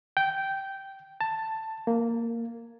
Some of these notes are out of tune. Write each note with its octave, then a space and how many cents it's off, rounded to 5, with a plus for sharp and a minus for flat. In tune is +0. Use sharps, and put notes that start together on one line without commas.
G5 -10
A5 +10
A#3 -10